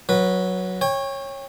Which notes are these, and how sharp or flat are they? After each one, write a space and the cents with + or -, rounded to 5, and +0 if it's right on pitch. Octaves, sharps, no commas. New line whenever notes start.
F#3 +0 B4 -15
C#5 -15 G5 +30